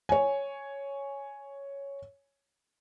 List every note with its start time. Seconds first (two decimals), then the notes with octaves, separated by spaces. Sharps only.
0.09 C#5 G#5